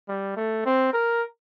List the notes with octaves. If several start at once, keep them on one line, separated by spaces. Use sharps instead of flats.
G3
A3
C4
A#4